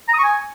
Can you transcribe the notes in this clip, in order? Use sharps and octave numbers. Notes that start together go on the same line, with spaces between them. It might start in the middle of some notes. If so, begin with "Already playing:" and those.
A#5
D#6
C#6
G#5